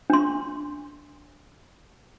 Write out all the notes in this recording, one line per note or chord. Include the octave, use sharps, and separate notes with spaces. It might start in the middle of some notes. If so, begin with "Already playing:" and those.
D4 C6